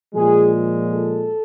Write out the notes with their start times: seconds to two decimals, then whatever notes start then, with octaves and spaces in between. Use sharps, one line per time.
0.15 A#2 F3 G#3 G#4
0.89 A4